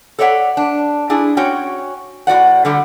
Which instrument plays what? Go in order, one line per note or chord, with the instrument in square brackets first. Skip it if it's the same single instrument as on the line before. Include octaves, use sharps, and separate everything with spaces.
[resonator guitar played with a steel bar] A4 C#5 D5 E5 F#5
D4
D4 E4 G#4
C#4 F#4 C#5 G5
A2 F#4 D5 F#5
D3 G3 A3